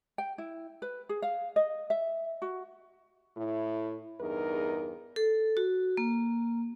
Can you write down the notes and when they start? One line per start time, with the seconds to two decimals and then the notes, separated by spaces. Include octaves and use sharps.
0.18 G5
0.38 E4
0.82 B4
1.09 G#4
1.22 F5
1.56 D#5
1.90 E5
2.42 F#4
3.37 A2 E4
4.21 E2 G2 D#4 G#4 A#4
5.16 A4
5.57 F#4
5.97 A#3